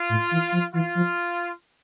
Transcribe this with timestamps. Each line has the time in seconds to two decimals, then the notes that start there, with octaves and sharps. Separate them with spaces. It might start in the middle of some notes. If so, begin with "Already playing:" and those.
Already playing: F4
0.09 A2
0.31 E3
0.52 F3
0.74 E3 F4
0.95 F3